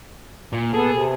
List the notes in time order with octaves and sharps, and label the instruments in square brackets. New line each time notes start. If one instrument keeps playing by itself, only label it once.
[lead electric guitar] A#2
[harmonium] B3 A4 [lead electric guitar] G#4
[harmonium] C3